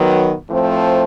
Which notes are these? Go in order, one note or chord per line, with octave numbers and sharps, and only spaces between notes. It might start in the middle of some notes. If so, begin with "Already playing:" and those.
Already playing: D#3 F#3 B3
A2 F3 A3 C4